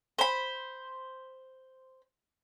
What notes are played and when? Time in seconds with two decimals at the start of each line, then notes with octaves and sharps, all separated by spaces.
0.19 C5 B5